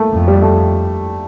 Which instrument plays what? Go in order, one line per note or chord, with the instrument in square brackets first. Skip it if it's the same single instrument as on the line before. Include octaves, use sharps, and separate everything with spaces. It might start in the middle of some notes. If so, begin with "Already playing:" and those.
Already playing: [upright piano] A3 A#3
[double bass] F2
[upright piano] G3
A3